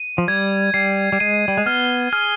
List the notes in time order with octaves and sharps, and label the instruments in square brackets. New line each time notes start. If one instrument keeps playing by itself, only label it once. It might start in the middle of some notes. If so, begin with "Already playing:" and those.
Already playing: [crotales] D#7
[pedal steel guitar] F3
[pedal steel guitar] G3 [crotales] G#6
[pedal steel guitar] G3 [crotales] C7
[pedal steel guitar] G3
[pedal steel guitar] G#3 [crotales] D#7
[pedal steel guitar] G3
G#3
[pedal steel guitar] B3 [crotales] F6
[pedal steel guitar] G#4 [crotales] F6